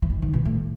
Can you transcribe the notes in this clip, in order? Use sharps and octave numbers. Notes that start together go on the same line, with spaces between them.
E3
D#3
D#3
B2
A2